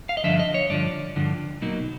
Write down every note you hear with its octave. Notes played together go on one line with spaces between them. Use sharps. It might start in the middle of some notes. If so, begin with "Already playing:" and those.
F5
D#5
G2 D3 F3 E5
D#5
C#5
G2 D3 F3 D5
G2 D3 F3
B2 F#3 A#3 D#4